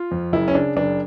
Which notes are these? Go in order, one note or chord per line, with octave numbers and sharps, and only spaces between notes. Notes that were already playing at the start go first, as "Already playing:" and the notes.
Already playing: F4
F2
F#1 E4
C#4
C#3 D4
F#1 D4